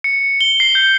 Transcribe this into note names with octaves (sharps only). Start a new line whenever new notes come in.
C#7
G7
C7
G6